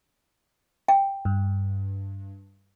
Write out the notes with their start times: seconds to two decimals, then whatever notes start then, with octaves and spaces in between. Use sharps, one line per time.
0.88 F5 G5
1.25 G2